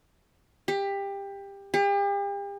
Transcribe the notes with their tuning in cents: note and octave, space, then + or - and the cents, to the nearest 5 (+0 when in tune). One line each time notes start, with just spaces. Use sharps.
G4 +20
G4 +40